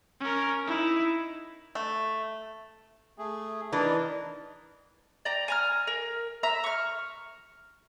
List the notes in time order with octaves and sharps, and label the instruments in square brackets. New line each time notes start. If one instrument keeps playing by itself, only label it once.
[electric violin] C#4 A#4
D#4 E4
[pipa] A3
[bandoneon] A3 G#4
[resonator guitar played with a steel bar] E3 D4 [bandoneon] D#4 A#4 B4
[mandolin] D5 G5 A#5
G#5 A#5 F6
A#4
E5 A#5
C#6 F6